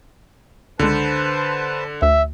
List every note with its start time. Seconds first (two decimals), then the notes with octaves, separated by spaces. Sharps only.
0.79 C#2 D3 G#3 B4 C5 A5
2.02 D2 E5